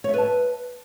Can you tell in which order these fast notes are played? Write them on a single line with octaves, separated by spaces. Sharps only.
C#5 E5 B4 A5